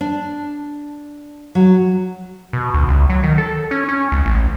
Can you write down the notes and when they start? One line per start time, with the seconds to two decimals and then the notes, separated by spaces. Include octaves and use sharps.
0.01 D4
1.55 F#3
2.53 B2
2.74 D2
2.88 C#2
3.10 F#3
3.23 D#3
3.38 A4
3.71 C#4
3.88 C#4
4.12 C#2
4.25 A1